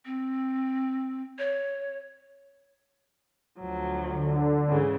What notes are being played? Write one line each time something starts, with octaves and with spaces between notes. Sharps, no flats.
C4
C#5
D2 F3 F#3
D3
G#2 C#3 E3